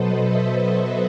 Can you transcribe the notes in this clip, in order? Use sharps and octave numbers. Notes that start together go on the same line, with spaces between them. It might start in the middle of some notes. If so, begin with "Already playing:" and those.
Already playing: B2 F#3 A4 B4 C5 D#5
C5 E5